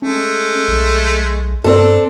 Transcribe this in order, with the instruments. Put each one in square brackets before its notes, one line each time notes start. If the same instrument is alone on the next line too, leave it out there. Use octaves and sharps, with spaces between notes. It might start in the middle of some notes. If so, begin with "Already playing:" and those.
[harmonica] G#3 A3 [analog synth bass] C#4
[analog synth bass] B1
[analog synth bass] G2 [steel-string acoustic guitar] C4 A4 [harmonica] D4